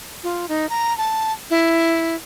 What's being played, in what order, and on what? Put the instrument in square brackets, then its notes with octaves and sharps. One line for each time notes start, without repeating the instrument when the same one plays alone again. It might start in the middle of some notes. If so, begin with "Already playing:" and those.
[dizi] F4
D#4
A#5
A5
E4